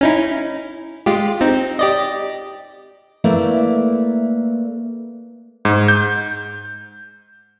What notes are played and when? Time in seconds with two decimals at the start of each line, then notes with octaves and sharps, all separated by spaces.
0.01 C#4 D#4 E4
1.06 G#3 F4 G4
1.41 C4 D#4
1.79 G4 D5 D#5
3.24 A3 A#3 E4 B4 D5 E5
5.65 G#2
5.88 G6